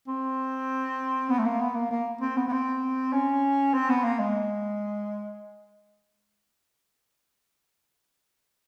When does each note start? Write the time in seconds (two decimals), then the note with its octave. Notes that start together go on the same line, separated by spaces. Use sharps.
0.08 C4
1.30 B3
1.38 A3
1.45 A#3
1.61 B3
1.75 A#3
1.91 A#3
2.21 C4
2.37 B3
2.48 B3
2.52 C4
3.13 C#4
3.74 C4
3.89 B3
4.04 A#3
4.20 G#3